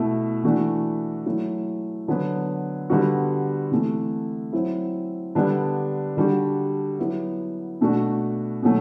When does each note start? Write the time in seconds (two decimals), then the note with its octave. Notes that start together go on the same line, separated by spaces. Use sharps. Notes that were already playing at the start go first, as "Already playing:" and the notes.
Already playing: B2 A3 E4
0.43 E3 A3 D4 F#4
1.26 F#3 A3 E4
2.08 D3 F#3 B3
2.90 D3 G3 B3 F#4
3.71 C3 E3 A3
4.52 F#3 C4 E4
5.35 D3 G3 B3 D4
6.17 D3 G3 D4 F#4
6.99 F#3 B3 E4
7.81 B2 A3 D4 F#4
8.63 B2 F#3 A3